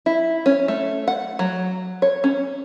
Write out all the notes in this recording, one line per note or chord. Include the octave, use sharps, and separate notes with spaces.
E4
C#4
A3
F#5
F#3
C#5
C#4